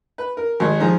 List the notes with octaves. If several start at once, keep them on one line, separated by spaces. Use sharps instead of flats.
B4
A#4
G#1 G#3
G#2 F3 G#4 A#5